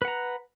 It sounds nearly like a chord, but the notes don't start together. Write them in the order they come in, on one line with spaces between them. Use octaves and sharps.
B4 F#5 A#5